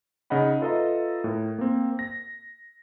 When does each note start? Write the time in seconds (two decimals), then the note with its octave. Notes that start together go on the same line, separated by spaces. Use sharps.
0.30 C#3 D#4 D#5 F#5 B5
0.61 F4 A4 B4 D#5 E5 A#5
1.24 A2 A#4
1.59 A#3 C4
1.99 A#6